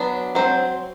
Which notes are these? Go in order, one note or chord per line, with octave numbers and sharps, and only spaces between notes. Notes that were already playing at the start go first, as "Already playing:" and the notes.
Already playing: F#3 B3 D4
F#3 C4 C5